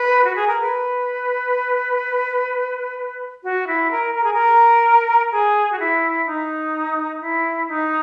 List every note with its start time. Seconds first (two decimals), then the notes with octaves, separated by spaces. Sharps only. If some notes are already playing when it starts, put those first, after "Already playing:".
Already playing: B4
0.25 F#4
0.36 G#4
0.48 A#4
0.61 B4
3.44 F#4
3.67 E4
3.91 A#4
4.15 A#4
4.24 G#4
4.34 A#4
5.32 G#4
5.72 F#4
5.79 E4
6.27 D#4
7.21 E4
7.69 D#4